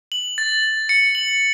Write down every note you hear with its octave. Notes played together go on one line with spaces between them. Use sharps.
F#7
A6
A6
C#7
F#7